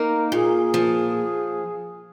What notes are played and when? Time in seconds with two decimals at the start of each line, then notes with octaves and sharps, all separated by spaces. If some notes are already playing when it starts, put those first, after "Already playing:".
Already playing: A#3 D#4 A#4
0.32 A#2 G#4
0.74 F3